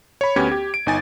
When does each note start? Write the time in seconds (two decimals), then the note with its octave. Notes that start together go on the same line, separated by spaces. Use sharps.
0.21 C#5 B5
0.36 D2 B3 C#4 G4 B5 G#6
0.51 G4
0.74 D7
0.86 G1 D#4 G#5 A6